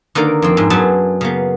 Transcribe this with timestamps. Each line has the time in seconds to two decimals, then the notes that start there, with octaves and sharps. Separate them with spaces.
0.15 D3 D#3 A#3 D5 A#5
0.42 F2 C4
0.57 G#2 D4 E4
0.70 F#2 F#3 B3 G#4 C5 A5
1.21 C#3 A#3 B3